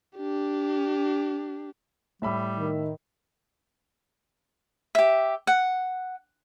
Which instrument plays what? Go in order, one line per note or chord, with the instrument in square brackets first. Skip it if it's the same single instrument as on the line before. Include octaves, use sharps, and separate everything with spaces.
[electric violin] D4 G4
[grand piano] A2 E5 B5 [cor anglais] G3
[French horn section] D#3
[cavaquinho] G4 E5
F#5